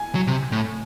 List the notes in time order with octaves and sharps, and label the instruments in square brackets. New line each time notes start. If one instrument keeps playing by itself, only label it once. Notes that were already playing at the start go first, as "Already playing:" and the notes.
Already playing: [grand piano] G#5
[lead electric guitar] F#3
C3
A2